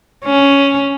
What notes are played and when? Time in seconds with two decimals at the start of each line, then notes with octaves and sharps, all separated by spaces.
0.25 C#4